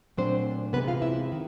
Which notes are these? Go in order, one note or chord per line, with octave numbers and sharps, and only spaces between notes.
A#2 F#3 A3 C4 D4 C5
C3 E3 G#3 B3 B4
F4 F5
E4 E5
D#3